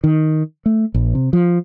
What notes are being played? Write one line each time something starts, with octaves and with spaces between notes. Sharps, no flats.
D#3
A3
A#1
C3
F3